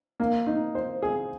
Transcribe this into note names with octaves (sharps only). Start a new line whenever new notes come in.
A#3
D#4
C5
G#4